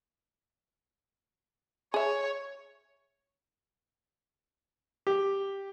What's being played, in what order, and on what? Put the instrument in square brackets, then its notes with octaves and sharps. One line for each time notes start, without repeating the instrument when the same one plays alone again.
[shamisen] G#4 E5 [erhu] C#5
[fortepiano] G4